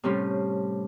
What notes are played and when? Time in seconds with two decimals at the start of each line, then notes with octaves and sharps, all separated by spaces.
0.04 A2 C3 G3 A3 C#4 C6